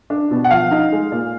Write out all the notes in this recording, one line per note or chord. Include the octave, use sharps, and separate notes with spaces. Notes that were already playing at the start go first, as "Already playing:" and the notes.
D4
B2
F#5
F3 F5
D#4
G#3
A#2